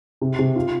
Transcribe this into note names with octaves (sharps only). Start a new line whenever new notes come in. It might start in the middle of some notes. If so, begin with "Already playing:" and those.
C3
C3
F4